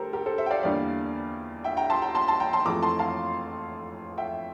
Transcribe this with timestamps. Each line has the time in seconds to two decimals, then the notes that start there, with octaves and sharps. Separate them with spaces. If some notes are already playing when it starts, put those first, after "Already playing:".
Already playing: D2 G4 A4 A#4 C5
0.13 G4 A#4
0.26 A4 C5
0.38 C5 E5
0.46 G5
0.51 D5 F5
0.63 E2 D3 G3 A#3 D4 D5 F5
1.64 E5 G5
1.77 G5 A#5
1.90 A5 C6
2.02 G5 A#5
2.15 A5 C6
2.28 A5 C6
2.40 G5 A#5
2.53 A5 C6
2.65 F2 E3 A3 A#5 D6
2.83 A5 C6
2.99 F5 A5
4.18 E5 G5